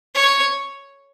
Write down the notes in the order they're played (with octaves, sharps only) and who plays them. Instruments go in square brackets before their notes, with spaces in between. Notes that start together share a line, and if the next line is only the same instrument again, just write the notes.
[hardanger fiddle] C#5